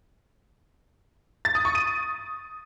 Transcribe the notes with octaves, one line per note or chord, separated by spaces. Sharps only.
A6
D#6
C#6
D#7